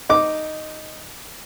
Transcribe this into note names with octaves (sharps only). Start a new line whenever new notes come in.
D#4 D6